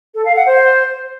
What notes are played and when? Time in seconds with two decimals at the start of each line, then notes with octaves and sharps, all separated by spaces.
0.15 A4
0.25 F5
0.36 F#5
0.46 C5